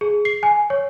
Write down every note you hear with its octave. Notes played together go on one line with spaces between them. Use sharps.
G#4
C7
G#5
C#5